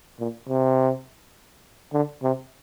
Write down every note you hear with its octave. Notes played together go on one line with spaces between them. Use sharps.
A#2
C3
D3
C3